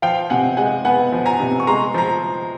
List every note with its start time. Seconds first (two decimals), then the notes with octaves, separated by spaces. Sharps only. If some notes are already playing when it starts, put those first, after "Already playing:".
0.02 F3 F5 G5
0.30 C3 F#5 G#5
0.57 G#3 F#5 G#5
0.85 B3 F#5 G#5
1.12 F3
1.26 G#5 A#5
1.40 C3
1.60 C#6
1.67 G#3 A#5 C6
1.94 F3 A#5